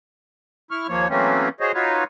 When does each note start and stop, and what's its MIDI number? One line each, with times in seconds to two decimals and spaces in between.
0.71 0.87 64
0.71 0.87 85
0.71 0.87 89
0.88 1.08 39
0.88 1.08 53
0.88 1.08 58
0.88 1.08 73
1.09 1.49 52
1.09 1.49 54
1.09 1.49 57
1.09 1.49 58
1.09 1.49 60
1.09 1.49 61
1.60 1.72 66
1.60 1.72 68
1.60 1.72 72
1.60 1.72 73
1.60 1.72 75
1.74 2.04 63
1.74 2.04 65
1.74 2.04 66
1.74 2.04 71
1.74 2.04 73